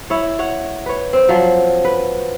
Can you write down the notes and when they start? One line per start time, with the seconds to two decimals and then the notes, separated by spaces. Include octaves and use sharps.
0.10 E4 C#5
0.39 C#5 F#5
0.86 B4 C#5
1.13 C4
1.29 F3 F#3
1.85 B4